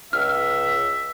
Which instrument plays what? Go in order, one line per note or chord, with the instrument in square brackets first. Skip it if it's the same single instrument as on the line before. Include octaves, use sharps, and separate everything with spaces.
[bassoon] C#2 [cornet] E5 [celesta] F6